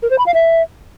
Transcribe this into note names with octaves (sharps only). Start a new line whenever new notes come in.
A#4
C5
B5
F5
E5